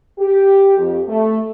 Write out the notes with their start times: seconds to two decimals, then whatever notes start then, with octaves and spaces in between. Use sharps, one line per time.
0.19 G4
0.78 F2
1.08 A3